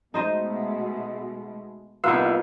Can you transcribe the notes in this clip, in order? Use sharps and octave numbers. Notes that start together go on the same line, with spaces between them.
B2 G#3 A3 D#4 C5 D#5
C2 A#3 B3 D#4 F4 B4 F5 E6